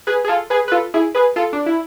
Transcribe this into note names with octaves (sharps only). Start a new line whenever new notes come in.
G#4 B4
G#4
F4 A4
G#4 B4
B4
F4 A4
E4 G#4
G#4 B4
F4 A4
D4
E4